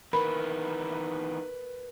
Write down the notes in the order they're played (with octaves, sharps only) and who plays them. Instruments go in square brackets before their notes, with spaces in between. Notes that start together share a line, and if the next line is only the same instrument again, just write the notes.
[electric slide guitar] D#3 E3 B3 [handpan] A#4 [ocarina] B4 [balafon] B5